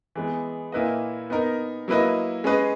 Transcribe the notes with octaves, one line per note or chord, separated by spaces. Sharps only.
E3 G#3 B3
A#2 A#3 E4 B4 D#5
B3 D#4 A#4
F#3 A#3 E4 B4 D#5
G#3 C#4 G#4 B4 D#5